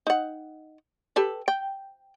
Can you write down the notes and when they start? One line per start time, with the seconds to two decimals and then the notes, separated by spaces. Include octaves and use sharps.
0.07 D#4 F#5
1.16 G4 A4 B4
1.48 G5